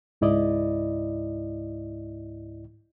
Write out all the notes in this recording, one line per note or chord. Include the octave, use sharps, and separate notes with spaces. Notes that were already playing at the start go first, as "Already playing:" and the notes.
C#2 G#2 E4 D5 D#5